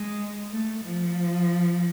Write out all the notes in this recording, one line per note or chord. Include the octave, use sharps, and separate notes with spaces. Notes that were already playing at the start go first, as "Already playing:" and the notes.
Already playing: G#3
A3
F3